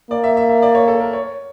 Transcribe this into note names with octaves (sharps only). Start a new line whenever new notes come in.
A#3 D5
E5
E5
E5
D5
C#5
A4
A#4
C#5